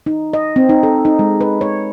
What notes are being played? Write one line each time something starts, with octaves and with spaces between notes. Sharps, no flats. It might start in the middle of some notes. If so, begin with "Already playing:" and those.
D#4
D#5
C4
D#4
A4
D#4
G#3
B4
C#5